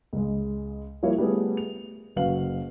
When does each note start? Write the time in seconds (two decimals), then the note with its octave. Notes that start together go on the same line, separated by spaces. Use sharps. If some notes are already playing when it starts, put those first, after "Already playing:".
0.13 C#2 G#3
1.03 F3 G3 A#3 E4 A#4 C#5
1.18 G3 A3 B3 G#4
1.57 F7
2.16 F#1 F#4 B4 F5 F#7